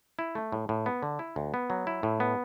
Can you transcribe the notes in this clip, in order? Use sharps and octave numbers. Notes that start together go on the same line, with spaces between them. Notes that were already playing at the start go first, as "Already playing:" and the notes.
E4
A3
A2
A2
B3
D3
E4
D2
B3
F#3
E4
A2
B3